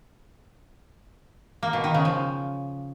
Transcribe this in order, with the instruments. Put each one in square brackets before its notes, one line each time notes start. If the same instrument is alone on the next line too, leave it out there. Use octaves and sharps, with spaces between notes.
[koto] A#3
B2
D#3
C#3
F3